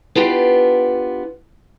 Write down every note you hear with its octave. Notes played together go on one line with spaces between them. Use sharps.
B3 D4 F4 G4